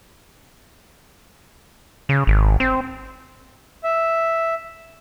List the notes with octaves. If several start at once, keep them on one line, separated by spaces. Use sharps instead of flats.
C#3
G#1
C4
E5